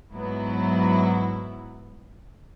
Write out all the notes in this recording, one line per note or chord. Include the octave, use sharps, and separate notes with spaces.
G#2 F#3 B3 E4